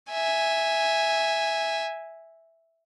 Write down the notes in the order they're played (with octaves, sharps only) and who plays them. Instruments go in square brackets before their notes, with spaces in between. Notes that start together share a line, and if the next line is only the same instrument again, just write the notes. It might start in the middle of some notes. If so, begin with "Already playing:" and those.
[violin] E5 G#5